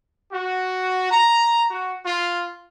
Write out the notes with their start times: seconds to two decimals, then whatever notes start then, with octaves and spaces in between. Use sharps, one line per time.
0.32 F#4
1.11 A#5
1.71 F#4
2.06 F4